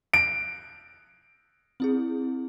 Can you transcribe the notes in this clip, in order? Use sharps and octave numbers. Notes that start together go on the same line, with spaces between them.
D7
C4 E4 G#4